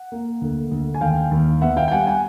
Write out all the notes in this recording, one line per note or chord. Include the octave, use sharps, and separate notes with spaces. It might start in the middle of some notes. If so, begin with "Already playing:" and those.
Already playing: F#5
A#3
D2
D2
G#5
D#2 F5 G5
D#2
B3 E5 F#5
F5 G5
G5
G3 F#5 G#5
F#5 G#5